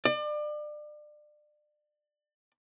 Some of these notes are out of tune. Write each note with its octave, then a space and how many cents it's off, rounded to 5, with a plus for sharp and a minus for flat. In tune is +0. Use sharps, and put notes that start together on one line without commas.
D5 +30